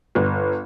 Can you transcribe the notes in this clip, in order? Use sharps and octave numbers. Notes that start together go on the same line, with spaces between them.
G1